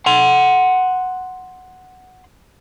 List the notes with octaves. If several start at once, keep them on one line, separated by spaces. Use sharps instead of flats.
F#5 C6